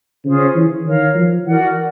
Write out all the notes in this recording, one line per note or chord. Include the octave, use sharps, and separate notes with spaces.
C#3 C#4 F4 G#4 C5
E3
D#3 A#4 C#5 F5
F3
E3 F#4 A#4 D5 F#5